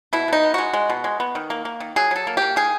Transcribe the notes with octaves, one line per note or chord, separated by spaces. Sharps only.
B2 E4
B2 D#4
B3
G#3 F#4
G#3
B2
G#3
B3
D#3
A#3
A#3
D#3
F#3 G#4
F#3 A4
A#3
A#3 G4
D#3 G#4